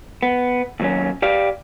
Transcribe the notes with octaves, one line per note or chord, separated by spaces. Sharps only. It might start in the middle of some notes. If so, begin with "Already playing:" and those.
B3
D#2 F#3 C#4
G4 D5 F5